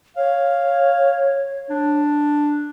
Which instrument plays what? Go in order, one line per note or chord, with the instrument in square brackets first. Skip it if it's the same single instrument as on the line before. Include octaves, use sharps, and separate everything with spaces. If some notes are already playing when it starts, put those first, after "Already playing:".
[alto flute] C#5 [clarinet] F5
[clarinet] D4